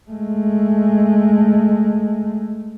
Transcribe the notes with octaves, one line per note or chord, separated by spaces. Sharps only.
G#3 A3